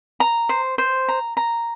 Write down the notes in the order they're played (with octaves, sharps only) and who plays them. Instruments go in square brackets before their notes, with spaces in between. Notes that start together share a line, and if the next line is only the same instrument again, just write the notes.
[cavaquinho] A#5
C5
C5
A#5
A#5